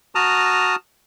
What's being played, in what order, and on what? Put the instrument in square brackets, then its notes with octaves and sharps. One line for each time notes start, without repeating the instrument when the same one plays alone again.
[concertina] F#4 A5 A#5 D#6 F6